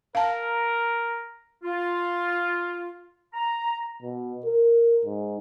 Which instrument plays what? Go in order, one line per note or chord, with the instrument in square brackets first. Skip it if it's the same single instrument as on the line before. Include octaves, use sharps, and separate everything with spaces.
[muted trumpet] A#4 [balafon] F5 A5
[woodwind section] F4
A#5
[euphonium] B2
A#4
G#2